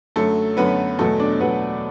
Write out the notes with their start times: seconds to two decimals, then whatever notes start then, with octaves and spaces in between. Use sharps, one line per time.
0.16 F#2 D3 F#3 A3 A4
0.57 F#2 D3 F#3 B3 B4
0.99 E2 B2 F#3 A3 A4
1.19 D4 D5
1.40 E2 B2 F#3 B3 B4